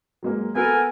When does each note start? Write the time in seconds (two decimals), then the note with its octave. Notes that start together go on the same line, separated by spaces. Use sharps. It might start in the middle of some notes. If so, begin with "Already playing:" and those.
0.23 F#3 G#3 A#3
0.55 B3 F#4 A4 A#4 G#5